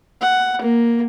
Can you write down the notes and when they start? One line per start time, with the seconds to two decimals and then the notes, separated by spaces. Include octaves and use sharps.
0.21 F#5
0.61 A#3